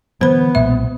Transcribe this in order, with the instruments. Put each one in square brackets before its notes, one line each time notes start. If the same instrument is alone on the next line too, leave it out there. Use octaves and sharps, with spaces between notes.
[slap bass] D3 E3 F#3 [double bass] B3 [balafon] C5 B5
[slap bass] B1 A#2 G#3 [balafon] E5